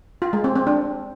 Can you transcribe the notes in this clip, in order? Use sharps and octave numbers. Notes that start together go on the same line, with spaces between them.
F4
G#3
C4
C4
D4